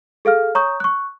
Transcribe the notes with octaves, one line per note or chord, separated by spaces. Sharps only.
G#4 A4 F5 F6
C#5 A#5 C#6 D#6 G6
C#6 F#6